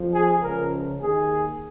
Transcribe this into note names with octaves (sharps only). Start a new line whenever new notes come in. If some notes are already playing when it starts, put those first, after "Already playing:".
Already playing: F2 F3
G#4
C#2 C#3 F3 A#4
D#2 D#3 G#4